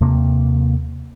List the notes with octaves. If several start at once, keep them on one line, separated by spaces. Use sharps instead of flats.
D#2 C3 A#3